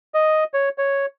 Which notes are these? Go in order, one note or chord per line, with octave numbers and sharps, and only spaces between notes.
D#5
C#5
C#5